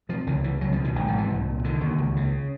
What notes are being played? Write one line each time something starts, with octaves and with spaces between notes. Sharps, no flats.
C3 F3
C#2 D#3
C#3 E3
C#2 F#3
F3
B2
D#3
G#1 D#3
F3
G#2
E3
C2
A#2
D3 D#3
D#2
C#2
C#3